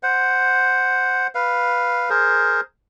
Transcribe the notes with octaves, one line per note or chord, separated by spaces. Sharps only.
C5 F#5
B4 F5
G#4 A#4 C5